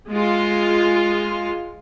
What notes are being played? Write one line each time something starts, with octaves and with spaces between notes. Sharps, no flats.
G#3 F4